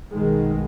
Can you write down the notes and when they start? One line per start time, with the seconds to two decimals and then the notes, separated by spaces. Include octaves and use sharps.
0.10 B1 B2 D#3 G#3